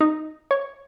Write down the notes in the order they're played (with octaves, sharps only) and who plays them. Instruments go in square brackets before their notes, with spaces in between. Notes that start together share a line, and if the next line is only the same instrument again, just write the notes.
[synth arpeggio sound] D#4
C#5